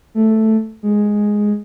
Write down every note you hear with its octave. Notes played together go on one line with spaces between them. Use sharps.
A3
G#3